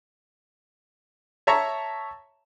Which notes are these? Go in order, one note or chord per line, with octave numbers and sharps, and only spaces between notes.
C#5 E5 A5 A#5 C#6